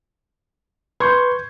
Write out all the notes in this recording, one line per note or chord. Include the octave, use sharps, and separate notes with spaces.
B4 C6 C#6 G6 G#6